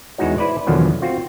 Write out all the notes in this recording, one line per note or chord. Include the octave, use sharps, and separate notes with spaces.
E2 E3 G#3 D#4 F#4 C#5
E4 B4 C5 D5
B1 E2 D3 D#3 F3 F#3
C4 F4 F#4